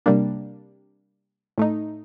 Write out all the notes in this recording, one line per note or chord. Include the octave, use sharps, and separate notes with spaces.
C3 G3 A#3 D4
A2 A3 D#4